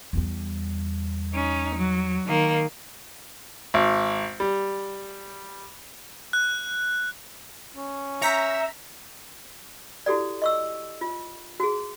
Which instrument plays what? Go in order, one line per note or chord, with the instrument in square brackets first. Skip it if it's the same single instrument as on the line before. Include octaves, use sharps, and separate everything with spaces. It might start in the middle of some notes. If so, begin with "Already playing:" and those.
[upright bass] E2 G3
[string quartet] C#4 D#4
F#3
D#3 A#3
[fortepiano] G#1
G3
[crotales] F#6
[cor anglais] C#4
[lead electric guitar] E5 [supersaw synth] A#5 B6 [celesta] E6 G6 C#7
[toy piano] E4 F#4 G4 A4 D5
D#5 C#6 E6
F4
F#4 G#4